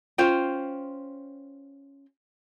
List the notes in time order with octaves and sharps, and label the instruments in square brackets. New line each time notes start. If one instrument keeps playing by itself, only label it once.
[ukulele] C#4 F4 C5 G5